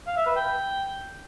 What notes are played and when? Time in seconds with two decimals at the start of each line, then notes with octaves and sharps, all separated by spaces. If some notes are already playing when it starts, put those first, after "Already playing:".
0.07 F5
0.17 E5
0.27 B4
0.36 G5